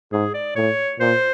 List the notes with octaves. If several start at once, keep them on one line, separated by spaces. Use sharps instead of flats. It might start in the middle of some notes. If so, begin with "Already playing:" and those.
G#2 G#4
D5
A2 C#5
A#2 C5